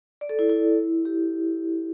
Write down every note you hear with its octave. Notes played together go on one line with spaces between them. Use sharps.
D5
A4
E4
E4
G4